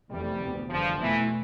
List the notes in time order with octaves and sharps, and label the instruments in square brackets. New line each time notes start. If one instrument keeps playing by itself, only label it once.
[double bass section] F1 E2 C3 E3 A3 [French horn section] G3
[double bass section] D2 C3 E3 B3
[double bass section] F1 E2 D3 G3 [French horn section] F3
[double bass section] E2 B2 A3 [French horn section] E3